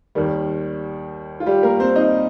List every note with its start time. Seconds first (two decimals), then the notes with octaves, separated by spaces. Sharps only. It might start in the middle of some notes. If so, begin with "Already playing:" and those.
0.15 D#2 D#3 G3
1.40 F4
1.46 G3 G4
1.63 A#3 A#4
1.80 C4 C5
1.96 D#4 D#5